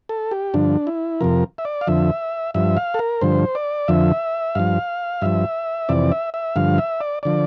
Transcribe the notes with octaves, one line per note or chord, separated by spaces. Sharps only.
A4
G4
G2 D3 F3 D4
E4
F2 C3 F3 A#4
E5
D5
F5
F2 D3 F3 E5
G2 F3 E5
F5
A4
A#4
G2 D3 F3 C5
D5
F2 D3 F3 E5
G2 F3 F5
G2 F3 E5
F2 C3 E3 D5
E5
E5
G2 D3 F3 F5
E5
D5
D3 F3 D5